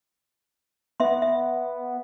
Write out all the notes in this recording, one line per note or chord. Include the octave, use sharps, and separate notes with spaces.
B3 E5 C6
E5